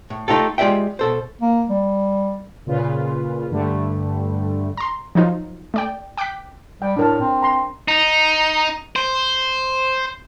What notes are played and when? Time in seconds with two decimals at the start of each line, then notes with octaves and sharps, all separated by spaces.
0.10 A2
0.28 A3 D#4 F4 G4 A4
0.58 G#3 F4 G4 D5 E5 G5
0.99 B2 A4 C5
1.42 A#3
1.69 G3
2.66 A#2 C#3 F4 B4
3.50 G2 D3 G3 A3
4.77 A#5 C6
5.15 F3 F#3 D#4 F4
5.74 A3 D5 G5
6.17 G5 D6 F#6 G6 B6
6.82 G3 G5
6.97 A2 D4 A#4 A5
7.20 C4
7.42 A#5 C6
7.88 D#4
8.96 C5